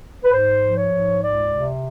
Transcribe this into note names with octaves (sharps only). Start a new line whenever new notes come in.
B4
G#2 C5
F3
C#5
G#2
C#2 D5
C3